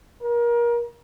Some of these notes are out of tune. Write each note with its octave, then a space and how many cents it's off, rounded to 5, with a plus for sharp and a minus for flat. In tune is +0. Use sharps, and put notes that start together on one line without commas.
A#4 +30